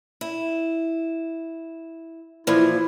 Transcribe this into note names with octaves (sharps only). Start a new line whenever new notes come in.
E4
A#2 E3 F3 E4